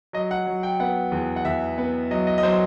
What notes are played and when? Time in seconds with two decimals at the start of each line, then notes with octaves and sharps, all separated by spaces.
0.13 F#3 D#5
0.31 F#5
0.47 F#3
0.63 G5
0.80 B3 F#5
1.12 E2
1.36 F#5
1.45 E2 E5
1.78 B3
2.11 F#3 D#5
2.27 D#5
2.38 D#5
2.43 F#3 C5